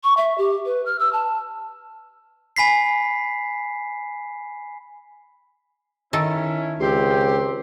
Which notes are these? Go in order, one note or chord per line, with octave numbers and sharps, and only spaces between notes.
C#6
E5
G4
B4
F6
E6
A5
G#5 B5 B6 C7
D#3 C#4 E4 A4
C#2 C4 G4 C6